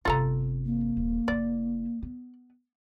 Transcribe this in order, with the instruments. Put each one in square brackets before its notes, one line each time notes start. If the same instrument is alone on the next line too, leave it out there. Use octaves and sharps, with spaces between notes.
[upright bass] G1 C3 [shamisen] F4 A4 A#5
[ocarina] A#3
[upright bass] D#1
[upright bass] F1 E4 [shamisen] D5
[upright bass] B3